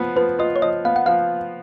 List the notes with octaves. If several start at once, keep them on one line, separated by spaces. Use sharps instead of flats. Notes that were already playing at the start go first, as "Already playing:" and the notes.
Already playing: F3 B3
F3 B4
F4 D#5
C#5
F3 D#5
B3 F5
F#5
F3 F5